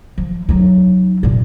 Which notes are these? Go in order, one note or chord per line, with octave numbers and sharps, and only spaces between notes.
F3
F#3 D#4
G2 A#2